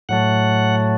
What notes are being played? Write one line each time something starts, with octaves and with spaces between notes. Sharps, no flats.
A2 F#3 A3 F#5